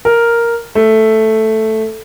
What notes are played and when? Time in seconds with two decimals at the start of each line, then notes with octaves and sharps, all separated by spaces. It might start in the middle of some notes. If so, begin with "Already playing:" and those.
0.05 A#4
0.75 A3